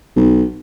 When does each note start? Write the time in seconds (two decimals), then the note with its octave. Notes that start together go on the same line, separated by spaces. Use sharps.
0.16 B1